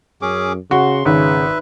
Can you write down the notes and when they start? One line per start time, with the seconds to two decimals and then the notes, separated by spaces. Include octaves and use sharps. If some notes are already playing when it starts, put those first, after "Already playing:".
0.22 F#2 C#4 G#4 D6
0.71 C#3 F#4 C6
1.05 G#1 C#3 B4 E5